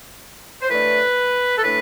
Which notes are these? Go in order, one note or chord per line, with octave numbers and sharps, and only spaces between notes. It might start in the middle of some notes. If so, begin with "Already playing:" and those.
C5
A2 E3 A3 D4 B4
A4
A2 E3 A3 D4 B4